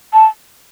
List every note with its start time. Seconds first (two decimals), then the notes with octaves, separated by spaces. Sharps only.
0.13 A5